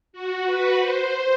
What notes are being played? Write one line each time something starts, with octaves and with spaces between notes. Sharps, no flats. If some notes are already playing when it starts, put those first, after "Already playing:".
F#4
B4
C5